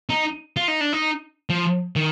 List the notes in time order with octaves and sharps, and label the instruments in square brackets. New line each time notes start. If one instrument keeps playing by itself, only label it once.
[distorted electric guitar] D#4
F4
D#4
D4
D#4
F3
D#3